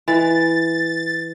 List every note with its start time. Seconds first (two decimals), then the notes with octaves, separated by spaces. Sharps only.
0.08 E3 A6